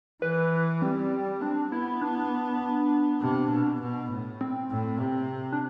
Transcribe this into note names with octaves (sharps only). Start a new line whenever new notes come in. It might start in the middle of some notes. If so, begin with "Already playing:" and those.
E3 B4
G3 C4
C4 D4
B3 E4
D4
C3
B2
B2
A2
C4
A2
C3
D4